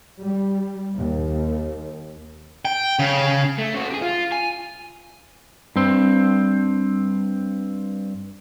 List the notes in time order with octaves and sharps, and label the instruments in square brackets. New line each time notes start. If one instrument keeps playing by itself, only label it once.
[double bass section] G3
D#2
[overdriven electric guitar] G5
C#3
A3
C#3 F#4
G4 G#4
F4
G#5
[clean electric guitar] G2 C4